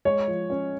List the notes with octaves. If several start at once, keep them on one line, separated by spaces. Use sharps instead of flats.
G#3 C#5
F3
C#4